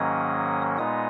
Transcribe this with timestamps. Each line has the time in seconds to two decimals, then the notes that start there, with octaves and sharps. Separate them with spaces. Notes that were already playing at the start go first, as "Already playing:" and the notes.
Already playing: G#2 D#3 F#3 A#3 C#4 D#6
0.78 A#2 G#3 B3 D#4 D#6